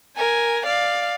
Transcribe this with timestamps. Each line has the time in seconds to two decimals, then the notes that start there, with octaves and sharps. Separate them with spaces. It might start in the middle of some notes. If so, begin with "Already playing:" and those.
0.17 A#4 G#5
0.66 D5 F5